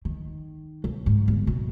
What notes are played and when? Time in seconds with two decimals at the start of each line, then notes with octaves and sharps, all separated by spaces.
0.05 D#3
0.84 B1
1.06 G#2
1.28 G1
1.47 B2